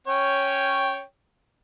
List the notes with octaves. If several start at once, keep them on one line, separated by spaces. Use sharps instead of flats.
C#4 C#5 G5